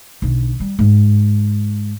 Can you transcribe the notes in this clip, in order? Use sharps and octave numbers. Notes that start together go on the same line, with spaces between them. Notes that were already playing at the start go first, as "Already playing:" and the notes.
B1 D3
G3
G#2